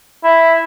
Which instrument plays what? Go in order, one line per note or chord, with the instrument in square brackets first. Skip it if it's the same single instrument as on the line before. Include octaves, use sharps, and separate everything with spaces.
[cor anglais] E4